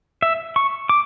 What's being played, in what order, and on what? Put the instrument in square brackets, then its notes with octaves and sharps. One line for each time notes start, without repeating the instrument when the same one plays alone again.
[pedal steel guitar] E5
C#6
D6